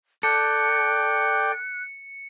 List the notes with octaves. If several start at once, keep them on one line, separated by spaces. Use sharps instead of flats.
A4 D5 G5 F#6 C#7